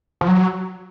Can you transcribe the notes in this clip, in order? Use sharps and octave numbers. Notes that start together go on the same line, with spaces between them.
F3
F#3